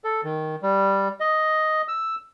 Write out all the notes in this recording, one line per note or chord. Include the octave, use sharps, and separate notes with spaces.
A4
D#3
G3
D#5
E6